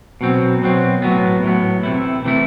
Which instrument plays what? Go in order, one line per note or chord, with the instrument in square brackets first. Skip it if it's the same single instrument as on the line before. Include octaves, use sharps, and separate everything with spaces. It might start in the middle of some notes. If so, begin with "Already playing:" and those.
[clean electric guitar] B2 F#3 C4
B2 F#3 C4
A2 F#3 B3
A2 F#3 B3
C3 E3 A3 E4
C3 E3 A3 E4